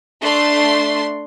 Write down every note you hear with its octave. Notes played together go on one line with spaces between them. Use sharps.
A3 D4 C6